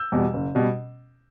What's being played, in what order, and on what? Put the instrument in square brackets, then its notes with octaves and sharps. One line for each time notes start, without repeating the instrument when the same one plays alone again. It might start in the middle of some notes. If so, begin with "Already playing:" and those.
Already playing: [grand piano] E6 G6
E2 B2 G3
F#1
B2 G3